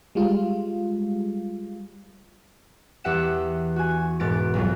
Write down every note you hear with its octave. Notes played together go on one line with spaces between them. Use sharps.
G3 G#3 F4
E2 G4 E5 F#5 E7
F#4 G#5
E1 G#2 B3 A6 D7
B1 F2 F#3